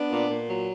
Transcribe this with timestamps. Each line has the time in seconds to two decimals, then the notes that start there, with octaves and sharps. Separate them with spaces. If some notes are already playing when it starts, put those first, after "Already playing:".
Already playing: B3 D4
0.12 A#2
0.30 A#2
0.49 F#3